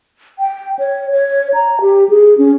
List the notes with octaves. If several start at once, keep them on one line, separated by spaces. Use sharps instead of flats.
G5
C#5
C#5
A#5
G4
G#4
C#4